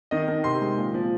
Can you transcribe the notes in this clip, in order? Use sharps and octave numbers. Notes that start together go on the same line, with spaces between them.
D#3 D#5
D#3
C3 C6
G#3
A#2
F3